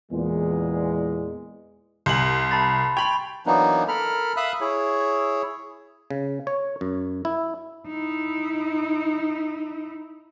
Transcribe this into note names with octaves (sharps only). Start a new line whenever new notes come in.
E2 A#2 G#3
C2 G#5 C6 F#7
A5 B5 A6
G5 B5 C#6 G#6 F7
E3 F#3 A#3 B3 D4 D#4
A4 A#4 B5 F6
E5 F5 B5 D#6 F#6
E4 G#4 C#5
C#3
C#5
F#2
E4
D#4 E4